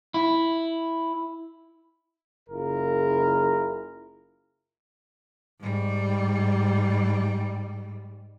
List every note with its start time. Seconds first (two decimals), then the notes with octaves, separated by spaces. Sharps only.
0.14 E4
2.49 F#1 E4 F4 G#4 A#4
5.60 G#2 G3